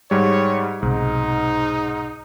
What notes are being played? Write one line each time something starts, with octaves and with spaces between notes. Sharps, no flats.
G#2 G3 C#5
B1 G#2 C3 D#4